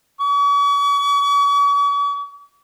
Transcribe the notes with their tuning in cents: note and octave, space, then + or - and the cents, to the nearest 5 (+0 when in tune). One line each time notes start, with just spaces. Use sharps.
C#6 +45